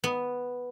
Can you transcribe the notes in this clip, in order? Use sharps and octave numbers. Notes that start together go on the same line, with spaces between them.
B3